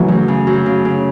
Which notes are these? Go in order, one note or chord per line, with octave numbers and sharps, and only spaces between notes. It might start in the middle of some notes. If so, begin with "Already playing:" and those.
Already playing: C#3 E3 F#3 A3
F#2
C#3
F#2
C#3
C#3